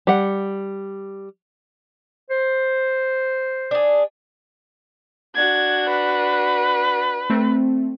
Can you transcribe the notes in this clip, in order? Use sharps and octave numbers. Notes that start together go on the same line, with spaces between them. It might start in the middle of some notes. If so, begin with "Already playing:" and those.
G3 F#5
C5
D4 G#4
D4 F#4 G#6
B4
A3 C4